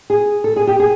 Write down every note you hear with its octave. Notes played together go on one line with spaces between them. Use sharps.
G#4
A4
G#4
G4
G#4